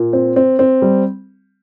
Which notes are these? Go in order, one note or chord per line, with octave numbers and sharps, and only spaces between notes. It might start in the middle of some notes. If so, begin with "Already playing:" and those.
Already playing: A#2
C4
C4
C4
G3